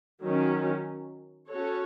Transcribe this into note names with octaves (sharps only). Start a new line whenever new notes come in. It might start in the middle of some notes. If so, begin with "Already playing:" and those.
D#3 F#3 C#4
C#4 F#4 A4 C#5